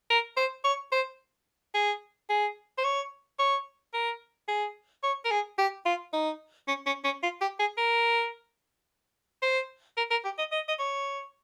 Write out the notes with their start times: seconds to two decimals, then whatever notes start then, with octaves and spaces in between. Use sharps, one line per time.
0.10 A#4
0.37 C5
0.65 C#5
0.92 C5
1.74 G#4
2.30 G#4
2.78 C5
2.84 C#5
3.39 C#5
3.94 A#4
4.48 G#4
5.03 C#5
5.25 A#4
5.31 G#4
5.58 G4
5.86 F4
6.13 D#4
6.68 C#4
6.86 C#4
7.04 C#4
7.23 F4
7.41 G4
7.60 G#4
7.77 A#4
9.42 C5
9.97 A#4
10.11 A#4
10.25 G4
10.39 D#5
10.52 D#5
10.68 D#5
10.79 C#5